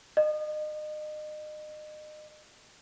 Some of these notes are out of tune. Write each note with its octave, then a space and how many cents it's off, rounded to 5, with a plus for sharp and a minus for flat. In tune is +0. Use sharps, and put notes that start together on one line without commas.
D#5 -35